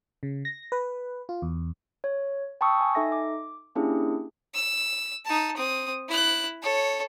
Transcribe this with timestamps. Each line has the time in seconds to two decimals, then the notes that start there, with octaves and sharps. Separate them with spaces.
0.23 C#3
0.45 A#6
0.72 B4
1.29 F4
1.42 E2
2.04 C#5
2.61 G5 A5 B5 C#6 D#6 E6
2.81 G#5
2.95 D#4 A4 E5 A#6
3.12 D6
3.75 A#3 C#4 D4 E4 G4 G#4
4.54 E6
5.25 D#4 A5
5.56 C4 D#6
6.09 E4 F#6
6.62 A4 C#5